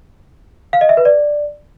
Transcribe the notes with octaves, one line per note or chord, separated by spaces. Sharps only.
F5
D#5
E5
B4
D5